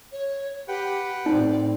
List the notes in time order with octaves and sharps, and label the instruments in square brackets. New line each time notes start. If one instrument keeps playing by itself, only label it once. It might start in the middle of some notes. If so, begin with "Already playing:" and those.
[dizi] C#5
[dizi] G4 [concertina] B4 F#5 G5
[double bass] A2 C4 [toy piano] D#4 [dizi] D5